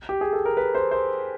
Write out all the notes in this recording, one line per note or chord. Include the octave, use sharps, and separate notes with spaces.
G4
G#4
A4
A#4
B4
C5
C5